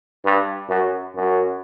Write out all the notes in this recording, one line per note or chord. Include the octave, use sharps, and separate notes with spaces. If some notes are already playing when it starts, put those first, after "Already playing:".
G2
F#2
F#2